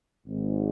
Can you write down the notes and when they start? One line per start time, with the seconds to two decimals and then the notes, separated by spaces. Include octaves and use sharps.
0.27 G#1 G#2